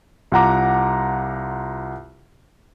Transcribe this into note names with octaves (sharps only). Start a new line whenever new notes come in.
C2 F4 F#5 A#5 D6